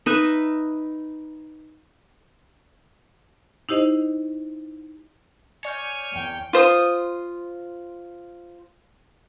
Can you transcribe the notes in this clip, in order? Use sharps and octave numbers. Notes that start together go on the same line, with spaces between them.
D#4 B4 E5
D#4 E4 G4 C5 D#5
C#5 D5 G#5 F6 G6
E2 G5
F4 C5 D#6